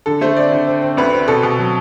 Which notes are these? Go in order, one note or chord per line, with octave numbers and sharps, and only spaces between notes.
D3 A4
A3 C5
C4 D5
D3
C4
C4
D2 B4
C4
B2 A4
B2
F#3